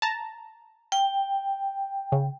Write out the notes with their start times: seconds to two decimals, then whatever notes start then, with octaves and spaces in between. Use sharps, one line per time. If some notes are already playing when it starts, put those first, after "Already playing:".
0.02 A5 A#5
0.92 G5
2.12 C#3